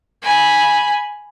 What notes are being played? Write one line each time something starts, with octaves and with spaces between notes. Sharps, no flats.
G#5 B5